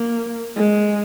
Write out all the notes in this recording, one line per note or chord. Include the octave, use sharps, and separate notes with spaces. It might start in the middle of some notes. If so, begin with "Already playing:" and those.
Already playing: A#3
G#3